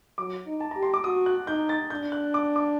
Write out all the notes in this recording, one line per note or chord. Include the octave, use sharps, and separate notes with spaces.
F#3 D6
D#4
A5
G4 A#5
C6
D6
F#4 D#6
F#6
D#4 G6
A6
D4 G6
F#6
D6
D6